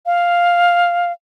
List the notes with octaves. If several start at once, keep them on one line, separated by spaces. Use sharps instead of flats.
F5